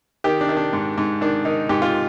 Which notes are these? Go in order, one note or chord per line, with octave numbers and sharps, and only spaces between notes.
D#3 G4
D4
D#3
D4
G#2
G#2
D#3 D4
D#3 D#4
G#2 G4
F4